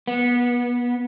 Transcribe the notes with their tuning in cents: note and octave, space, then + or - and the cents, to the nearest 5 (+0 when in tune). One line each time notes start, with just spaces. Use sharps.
B3 -25